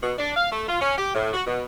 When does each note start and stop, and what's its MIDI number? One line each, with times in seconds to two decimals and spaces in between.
0.02 0.13 47
0.19 0.33 62
0.37 0.50 77
0.52 0.66 57
0.67 0.81 65
0.81 0.97 61
0.98 1.12 67
1.15 1.31 45
1.34 1.42 66
1.46 1.65 47